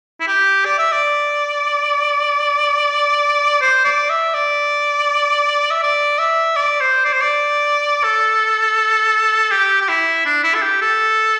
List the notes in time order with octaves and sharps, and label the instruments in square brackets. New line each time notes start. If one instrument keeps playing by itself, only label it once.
[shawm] E4
G4
D5
E5
D5
C5
D5
E5
D5
E5
D5
E5
D5
C5
D5
C5
D5
A4
G4
G4
E4
D4
E4
A4
G4
A4